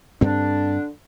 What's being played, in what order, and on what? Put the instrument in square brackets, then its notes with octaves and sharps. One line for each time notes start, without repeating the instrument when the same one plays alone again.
[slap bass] G2 C4 [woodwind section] D3 D4